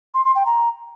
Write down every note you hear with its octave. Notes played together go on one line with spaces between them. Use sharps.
C6
C6
G5
A#5